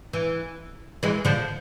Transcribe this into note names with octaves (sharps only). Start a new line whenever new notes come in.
E3
E3 G#3
D3 F3